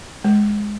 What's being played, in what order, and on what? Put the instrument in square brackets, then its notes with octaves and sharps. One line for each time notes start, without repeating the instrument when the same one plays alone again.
[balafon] G#3